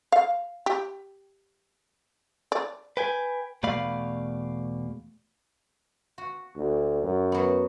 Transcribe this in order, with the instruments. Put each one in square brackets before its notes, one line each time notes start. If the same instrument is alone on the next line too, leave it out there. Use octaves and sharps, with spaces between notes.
[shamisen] F5
G4
D5
[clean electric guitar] B4 G5 G#5
E2 B2 A3 D5 F5 B5
[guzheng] F#4
[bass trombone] D2
F#2
[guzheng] F#3 B3